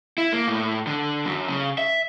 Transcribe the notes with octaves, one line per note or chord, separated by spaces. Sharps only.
E4
A#3
A2
D3
F#2
C#3
E5